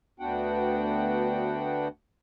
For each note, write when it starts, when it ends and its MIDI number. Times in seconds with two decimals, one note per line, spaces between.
0.20 1.88 38
0.20 1.88 59
0.20 1.88 62
0.20 1.88 66
0.20 1.88 78
0.20 1.88 79